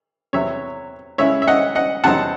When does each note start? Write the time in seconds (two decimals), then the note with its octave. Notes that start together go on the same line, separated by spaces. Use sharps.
0.33 E2 C3 F#3 C#5 E5
1.18 C#3 G#3 C#4 E4 C#5 E5
1.42 E5
1.48 D#5 F#5
1.75 D#5 F#5
2.04 E2 C3 F#3 C4 D#4 F#5 A5